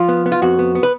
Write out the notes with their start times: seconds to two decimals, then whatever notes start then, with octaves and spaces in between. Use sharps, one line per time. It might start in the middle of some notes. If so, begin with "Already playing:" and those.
Already playing: F3 F4
0.09 B3
0.26 B3
0.32 F4
0.42 F2 F#4
0.59 B3
0.75 B3
0.83 B4